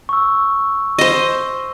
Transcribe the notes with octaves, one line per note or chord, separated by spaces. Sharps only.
C#6 E6
C5 D#5